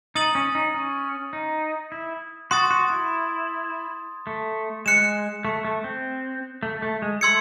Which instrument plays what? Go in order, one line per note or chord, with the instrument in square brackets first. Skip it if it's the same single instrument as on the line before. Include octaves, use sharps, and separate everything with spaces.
[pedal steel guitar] D#4 [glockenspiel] D#6 A6 D#7 F#7
[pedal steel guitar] C#4
D#4
C#4
D#4
E4
[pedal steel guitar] F#4 [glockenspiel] C6 D#6 A6
[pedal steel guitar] F#4
E4
A3
[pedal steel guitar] G#3 [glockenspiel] F#6 C#7 E7
[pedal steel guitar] A3
A3
C4
A3
A3
G#3
[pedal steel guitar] A3 [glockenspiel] C6 E6 G#6 C#7